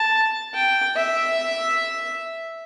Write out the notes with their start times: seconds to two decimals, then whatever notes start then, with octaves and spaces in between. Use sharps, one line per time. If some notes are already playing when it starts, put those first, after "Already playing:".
Already playing: A5
0.54 G5
0.96 E5